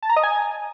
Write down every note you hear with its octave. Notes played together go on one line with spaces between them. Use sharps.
A5
A#5
D#5
G#5